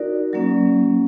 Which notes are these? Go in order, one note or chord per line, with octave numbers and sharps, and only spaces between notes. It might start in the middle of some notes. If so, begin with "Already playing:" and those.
Already playing: D#4 F#4 A#4 D5
F#3 A#3 C#4